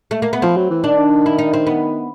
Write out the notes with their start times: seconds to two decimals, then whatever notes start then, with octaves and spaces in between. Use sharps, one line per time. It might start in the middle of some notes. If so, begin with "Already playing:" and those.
0.11 A3
0.22 A#3
0.33 B3
0.42 F3 C4
0.57 F#3
0.70 E3
0.84 D#3 D4
1.26 E4
1.38 D#4
1.53 C4
1.67 B3